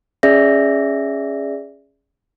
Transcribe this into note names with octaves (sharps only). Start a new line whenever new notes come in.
C#4 G#4 D5 E5 A#6